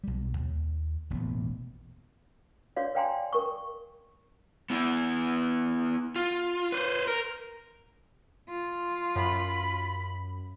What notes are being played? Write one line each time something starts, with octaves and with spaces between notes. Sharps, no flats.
B1 G3
D#2
E1 A1 A#2 B3
F#4 C#5 D5 F5
D5 F5 G5 G#5 A#5 C6
A#4 C#6
B3 E4
F4
B4 C5
A#4
F4
F#2 B5